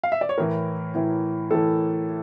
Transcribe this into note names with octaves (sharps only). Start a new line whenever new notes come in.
F5
E5
D5
C#5
A2 E3 A#4
A2 E3
A2 E3 A4